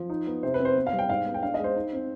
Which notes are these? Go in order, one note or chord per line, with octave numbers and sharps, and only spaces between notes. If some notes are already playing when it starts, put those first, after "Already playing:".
Already playing: F3
D#4
B3
C3 C5
B4
C4
C5
B3
F5
G3
G5
G#2 F5
B3
G5
D4 F5
G#3 D#5
C5
D#4
C4